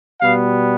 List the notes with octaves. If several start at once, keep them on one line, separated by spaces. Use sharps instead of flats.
B2 G3 B3 F5